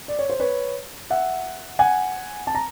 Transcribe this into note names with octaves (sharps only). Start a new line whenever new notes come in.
D5
C#5
C5
B4 C#5
E5 F#5
F#5 G#5
A5
A#5